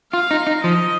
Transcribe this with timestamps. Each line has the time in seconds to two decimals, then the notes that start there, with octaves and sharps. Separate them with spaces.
0.12 F4 F5
0.31 D#4
0.47 D#4
0.64 F3 D#5